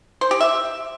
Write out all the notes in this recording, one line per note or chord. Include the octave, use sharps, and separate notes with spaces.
C5
G4
E5